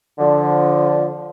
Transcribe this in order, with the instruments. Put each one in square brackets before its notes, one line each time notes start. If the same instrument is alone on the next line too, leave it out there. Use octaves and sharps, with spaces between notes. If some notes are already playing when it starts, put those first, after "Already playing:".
[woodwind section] D3 F3